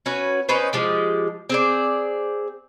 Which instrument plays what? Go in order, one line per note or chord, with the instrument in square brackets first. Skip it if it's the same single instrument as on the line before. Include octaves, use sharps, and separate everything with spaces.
[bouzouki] C#4 F#4 B4
C#4 D#4 B4 C5
F3 G#3 G4
C4 G#4 D5